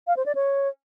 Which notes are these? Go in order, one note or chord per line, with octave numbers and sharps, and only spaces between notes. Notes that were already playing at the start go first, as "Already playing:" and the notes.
F5
C5
D5
C#5